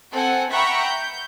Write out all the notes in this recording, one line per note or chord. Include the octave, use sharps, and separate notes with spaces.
C4 A4 F#5 G#5
E5 F#5 G5 A#5 B5 C#6
G6